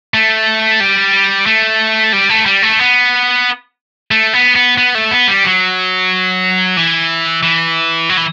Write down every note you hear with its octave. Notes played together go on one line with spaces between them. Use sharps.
A3
G3
A3
G3
A3
G3
A3
B3
A3
B3
B3
B3
A3
B3
G3
F#3
E3
E3
F#3
E3